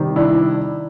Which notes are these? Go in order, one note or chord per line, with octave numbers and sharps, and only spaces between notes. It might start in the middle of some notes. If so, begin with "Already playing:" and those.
Already playing: C3 D#3 G3
D4 E4